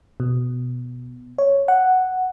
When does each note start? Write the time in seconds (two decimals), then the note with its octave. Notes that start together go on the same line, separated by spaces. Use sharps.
0.20 B2
1.38 C#5
1.68 F#5